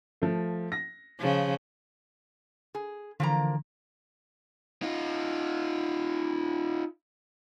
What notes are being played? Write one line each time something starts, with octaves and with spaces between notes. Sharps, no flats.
F3 A3
A#6
C#3 F3
G#4
D3 E3 F3 A#3 A#5
D#4 F4